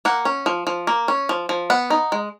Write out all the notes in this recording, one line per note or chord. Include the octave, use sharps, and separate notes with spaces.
A#3 F#5
C#4
F3
F3
A#3
C#4
F3
F3
B3 F#5
D#4
G#3